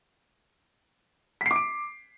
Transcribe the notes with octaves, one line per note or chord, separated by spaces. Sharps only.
D6 B6 C7 D7